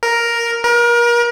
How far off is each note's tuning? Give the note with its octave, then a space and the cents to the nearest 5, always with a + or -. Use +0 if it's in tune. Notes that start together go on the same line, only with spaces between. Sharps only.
A#4 +5
A#4 +35